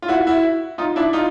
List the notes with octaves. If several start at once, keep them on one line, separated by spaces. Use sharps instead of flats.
F4
E4 F#4
E4 F#4
D#4 F4
D4 E4
D#4 F4